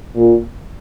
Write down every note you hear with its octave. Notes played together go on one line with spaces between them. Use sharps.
A#2